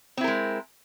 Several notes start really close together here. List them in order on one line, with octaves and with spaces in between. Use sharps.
C4 E4 A#4 G#3